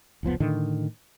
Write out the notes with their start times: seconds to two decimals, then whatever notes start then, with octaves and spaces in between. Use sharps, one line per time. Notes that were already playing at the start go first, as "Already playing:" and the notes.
0.23 F1 C#2 F3 B3
0.40 A2 D3 D#3 D4